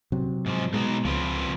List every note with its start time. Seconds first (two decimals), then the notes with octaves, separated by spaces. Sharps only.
0.12 C3 F#3
0.46 G#2 F3
0.74 B2 G#3 D#4 F#4
1.05 C#2 F3 C4 B4